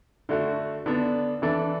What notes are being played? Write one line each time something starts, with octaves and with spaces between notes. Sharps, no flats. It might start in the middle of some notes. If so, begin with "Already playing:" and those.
D3 A3 F#4
D3 B3 D4
E3 D4 A4 D5